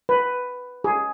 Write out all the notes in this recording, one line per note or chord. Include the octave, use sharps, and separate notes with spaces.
B4
G#4